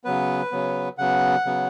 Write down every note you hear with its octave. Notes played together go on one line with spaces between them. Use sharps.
C#3 F#3 B3 B4
C#3 F#3 B3
C#3 F#3 B3 F#5
C#3 F#3 B3